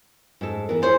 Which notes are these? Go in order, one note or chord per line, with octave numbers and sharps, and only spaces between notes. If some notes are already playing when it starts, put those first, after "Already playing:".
G#2 A4
E3 B3 A#4
E4 G#4 C5 C#5